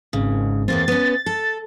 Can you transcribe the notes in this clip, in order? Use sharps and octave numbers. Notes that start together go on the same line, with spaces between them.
G#1 C#3
E2 A#3 C4 A6
B3 C#4
A4